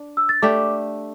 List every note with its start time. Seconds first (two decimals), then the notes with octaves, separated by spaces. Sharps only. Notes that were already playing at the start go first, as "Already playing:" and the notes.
Already playing: D4
0.17 E6
0.29 A6
0.42 A3 D4 G4 D6